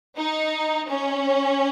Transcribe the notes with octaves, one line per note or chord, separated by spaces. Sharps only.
D#4
C#4